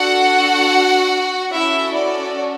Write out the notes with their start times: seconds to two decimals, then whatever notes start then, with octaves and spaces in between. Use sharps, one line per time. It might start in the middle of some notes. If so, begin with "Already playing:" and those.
Already playing: D4 F#4 A4 F#5
1.53 C#4 E4 F#4 A4 E5
1.95 D5